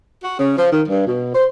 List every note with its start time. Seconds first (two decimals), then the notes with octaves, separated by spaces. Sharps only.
0.24 F#4
0.39 C#3
0.58 F3
0.72 D#3
0.88 G2
1.07 B2
1.35 C5